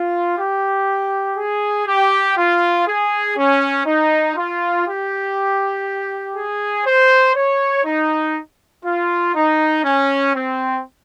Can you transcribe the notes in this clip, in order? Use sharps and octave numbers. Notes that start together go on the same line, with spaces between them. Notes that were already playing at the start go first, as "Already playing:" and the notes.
Already playing: F4
G4
G#4
G4
F4
G#4
C#4
D#4
F4
G4
G#4
C5
C#5
D#4
F4
D#4
C#4
C4